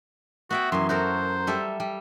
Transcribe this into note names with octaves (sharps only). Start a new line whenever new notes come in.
B3 F#4 E5 G5
F#2 E3 C6
F#4 A4 A#4 C5
G3 A4 E5
G3